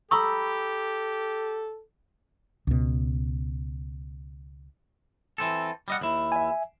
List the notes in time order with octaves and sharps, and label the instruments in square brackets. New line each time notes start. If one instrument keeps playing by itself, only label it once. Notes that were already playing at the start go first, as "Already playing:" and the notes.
[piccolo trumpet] G4 [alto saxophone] A4 [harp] A#5 B5 [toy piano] C#6 D#6 E6
[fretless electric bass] C#2 B2
[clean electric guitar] E3 C4 A4
G3 D#5 F#5
D#2 E4
[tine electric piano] E5 G#5